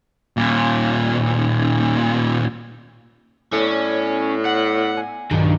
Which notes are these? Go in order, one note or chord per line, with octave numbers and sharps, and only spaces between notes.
D#2 A#2
A2 B3 C#4 A4 D5
F#5
G#5
B1 G2 A#2 D#3